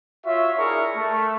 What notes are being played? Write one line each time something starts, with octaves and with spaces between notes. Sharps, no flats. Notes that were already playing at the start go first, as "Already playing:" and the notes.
F4 F#4 C#5 E5
D4 E4 G#4 A#4 C#6
A3